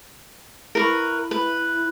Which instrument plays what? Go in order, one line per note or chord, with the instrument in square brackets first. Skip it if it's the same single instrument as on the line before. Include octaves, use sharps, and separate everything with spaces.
[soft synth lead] E4 [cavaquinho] A#4 B4 C#6
[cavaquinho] B4